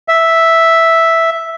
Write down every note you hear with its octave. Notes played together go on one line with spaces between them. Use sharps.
E5